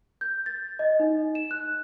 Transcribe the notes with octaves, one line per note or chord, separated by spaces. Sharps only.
G6
A6
D#5
D#4
E7
F#6